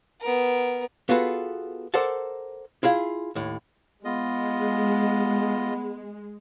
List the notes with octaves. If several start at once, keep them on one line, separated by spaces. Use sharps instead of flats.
B3 A#4
B3 F4 F#4 G#4 A4 B4
A4 A#4 C5 D5 F#5 A5
E4 F4 G#4 F5
D#2 A2
G#3 B3 F4 D#5